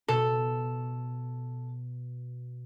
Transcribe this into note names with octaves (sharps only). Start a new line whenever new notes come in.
B2 A4